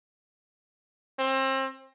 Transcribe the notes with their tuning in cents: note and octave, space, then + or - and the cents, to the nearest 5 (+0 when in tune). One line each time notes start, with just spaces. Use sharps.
C4 +30